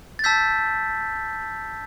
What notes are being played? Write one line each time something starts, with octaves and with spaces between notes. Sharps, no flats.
A6
A5 E6 G6 B6